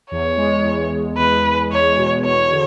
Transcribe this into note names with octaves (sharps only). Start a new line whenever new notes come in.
E2 C#5
G#3
E2
E2
E2 B4
E2
E2 C#5
B2
E2 C#5
D3